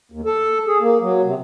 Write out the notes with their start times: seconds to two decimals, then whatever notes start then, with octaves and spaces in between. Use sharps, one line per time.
0.12 D#2
0.25 A4
0.67 G#4
0.81 A#3
1.01 F#3
1.24 C3